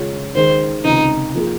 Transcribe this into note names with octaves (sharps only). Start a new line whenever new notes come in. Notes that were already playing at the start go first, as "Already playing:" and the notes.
Already playing: C#3 G#3 C#4 F4
D#2 D#3 G#3 C5
C#2 C3 D#3 D#4
F3 A#3 F4 G#4